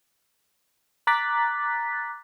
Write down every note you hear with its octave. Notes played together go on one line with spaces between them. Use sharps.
A#5 D6 F#6 A6 B6